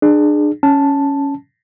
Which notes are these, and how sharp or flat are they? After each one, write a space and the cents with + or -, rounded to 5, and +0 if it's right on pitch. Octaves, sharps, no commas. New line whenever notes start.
D4 +30 G#4 +0
C#4 +5 A5 +0